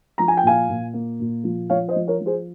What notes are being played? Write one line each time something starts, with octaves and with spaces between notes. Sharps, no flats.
F3 A#5
G#5
G5
A#2 F5 G#5
A#2
A#3
A#2
F3
F3 C#5 F5
C5 D#5
F3
A#4 C#5
F3
G#4 C5